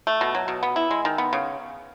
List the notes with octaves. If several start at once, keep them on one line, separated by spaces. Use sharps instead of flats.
A3
B2
F#3
B2
B3
E4
G#3
D#3
B3
C#3